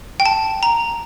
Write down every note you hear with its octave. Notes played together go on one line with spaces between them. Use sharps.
G5
A5
A#5